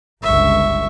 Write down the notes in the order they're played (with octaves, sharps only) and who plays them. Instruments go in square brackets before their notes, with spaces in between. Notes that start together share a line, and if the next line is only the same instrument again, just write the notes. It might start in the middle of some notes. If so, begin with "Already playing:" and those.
[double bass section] G1 C#2 [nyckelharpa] E5 C#6